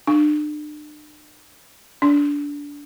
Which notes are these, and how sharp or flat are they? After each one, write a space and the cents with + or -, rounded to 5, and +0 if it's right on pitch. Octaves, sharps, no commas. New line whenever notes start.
D4 +40
D4 -20